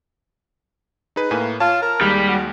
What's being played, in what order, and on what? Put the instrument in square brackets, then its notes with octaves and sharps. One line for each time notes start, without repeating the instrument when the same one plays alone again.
[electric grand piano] D#4 G#4 B4
[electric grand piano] A2 B4 G#5 [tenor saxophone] A#3
[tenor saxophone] F4 [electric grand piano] C#5 A5
[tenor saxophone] A#4
[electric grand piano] D#2 G#3 [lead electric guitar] G3
[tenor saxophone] F#4